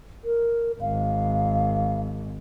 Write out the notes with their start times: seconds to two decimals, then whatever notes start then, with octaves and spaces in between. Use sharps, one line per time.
0.24 A#4
0.81 G#1 F5